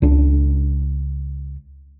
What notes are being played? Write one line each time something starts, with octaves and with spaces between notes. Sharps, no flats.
C#2 D4